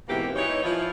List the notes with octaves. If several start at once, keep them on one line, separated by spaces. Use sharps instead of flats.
G#2 B2 E3 A#3 C4 G4
E3 D#4 C#5
F3 E4 F4